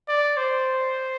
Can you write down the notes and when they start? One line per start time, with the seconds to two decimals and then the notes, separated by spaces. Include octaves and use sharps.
0.09 D5
0.37 C5